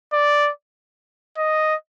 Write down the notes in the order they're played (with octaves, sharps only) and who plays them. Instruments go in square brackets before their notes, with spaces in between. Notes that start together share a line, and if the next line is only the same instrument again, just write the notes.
[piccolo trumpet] D5
D#5